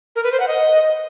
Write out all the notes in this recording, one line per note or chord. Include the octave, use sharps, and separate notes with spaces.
A#4
B4
C5
F#5
D#5